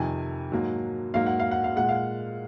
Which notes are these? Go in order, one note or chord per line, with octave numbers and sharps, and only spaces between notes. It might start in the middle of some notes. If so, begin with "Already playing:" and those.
Already playing: F2 C3 D#3 G#5
G#2 F#3 A#3
G#2 F#3 A#3 F5
F#5
F5
F#5
F5
A#2 G#3 F#5
F5